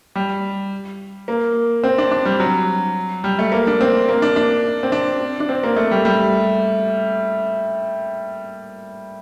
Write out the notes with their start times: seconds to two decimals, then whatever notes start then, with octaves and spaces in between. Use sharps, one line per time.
0.15 G3
1.28 A#3
1.83 C4
1.98 D4
2.11 D4
2.25 G3
2.40 F#3
3.24 G3
3.39 A3
3.52 A#3
3.67 D4
3.81 C4
4.09 A#3
4.22 D4
4.36 D4
4.83 C4
4.92 D4
5.40 D4
5.49 C4
5.63 A#3
5.76 A3
5.91 G3
6.05 G3